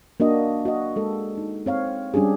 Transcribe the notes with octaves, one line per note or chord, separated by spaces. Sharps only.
A#3 D4 F#4 D#5
F#4 D#5
G#3 A4
D#4
C4 C#5 F5
G3 C#4 D4 G4 G#4